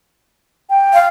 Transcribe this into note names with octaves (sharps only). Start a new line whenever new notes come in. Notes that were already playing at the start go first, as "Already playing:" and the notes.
G5
F5